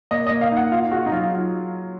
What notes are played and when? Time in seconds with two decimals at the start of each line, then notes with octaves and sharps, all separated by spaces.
0.11 A#3 D#5
0.27 A#3 D#5
0.41 F5
0.52 D#4 F#5
0.72 F4 F5
0.92 F#4 G#4
1.06 D#4
1.12 F#3 F4